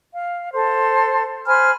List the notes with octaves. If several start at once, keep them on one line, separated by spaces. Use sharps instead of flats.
F5
A4 C5
C5 G#5 B5 F6